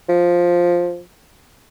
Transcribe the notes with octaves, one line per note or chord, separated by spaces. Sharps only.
F3